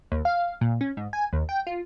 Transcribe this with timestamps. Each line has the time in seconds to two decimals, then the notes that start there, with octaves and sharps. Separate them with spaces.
0.12 D#2
0.25 F5
0.61 A#2
0.81 C#4
0.97 G#2
1.13 G#5
1.33 D#2
1.49 G5
1.67 F4